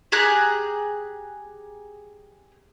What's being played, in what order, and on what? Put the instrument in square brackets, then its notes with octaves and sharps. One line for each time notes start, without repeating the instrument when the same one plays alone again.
[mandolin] G4 G#4 A#5 F#6